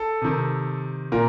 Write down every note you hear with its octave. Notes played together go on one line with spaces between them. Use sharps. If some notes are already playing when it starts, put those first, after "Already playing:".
Already playing: A4
C3 D#3
A#2 A#4